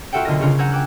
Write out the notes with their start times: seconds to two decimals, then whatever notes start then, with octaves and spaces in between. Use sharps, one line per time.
0.13 F4 F#4 A4 E5 F#5 G5
0.25 B1 D3 F4 A#4 D#5 A#6
0.39 C#3 C#4 D4 F4
0.59 F#5 G#5 A#5 E6 G6 G#6
0.72 G5 D6 E6 F#6